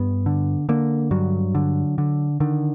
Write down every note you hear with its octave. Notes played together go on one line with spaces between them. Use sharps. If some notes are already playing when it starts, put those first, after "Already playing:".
Already playing: G2 B3
D3
D3 A#3
G2 F#3
D3
D3
D3 D#3